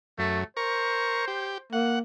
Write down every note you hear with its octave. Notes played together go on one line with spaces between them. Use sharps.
F#2 A3
A#4 C5 C#6
G4
A#3 F#5